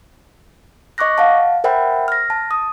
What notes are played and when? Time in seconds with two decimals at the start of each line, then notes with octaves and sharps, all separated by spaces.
0.98 D#5 C#6 D6 F#6 A#6
1.18 F5 F#5 A5
1.64 A#4 C5 E5 F#5 G5 B5
2.08 F6 A#6
2.30 A5
2.51 D#6